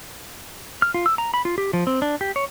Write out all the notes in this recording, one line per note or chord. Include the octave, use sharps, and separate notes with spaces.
F6
F4
E6
A#5
B5
F4
G4
F3
C4
D4
G4
C#5